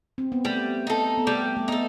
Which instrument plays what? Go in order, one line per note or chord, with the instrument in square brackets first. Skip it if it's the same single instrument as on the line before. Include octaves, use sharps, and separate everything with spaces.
[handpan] C4
B3
[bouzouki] G3 [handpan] A3
[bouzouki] D#4 A4
[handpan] B3
[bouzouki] G3 [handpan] A3
[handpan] A3
[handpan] B3 [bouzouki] D#4 A4